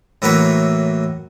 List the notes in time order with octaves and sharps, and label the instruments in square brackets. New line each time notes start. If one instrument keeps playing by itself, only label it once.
[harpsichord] A2 E3 F#3 A#3 B4 C#5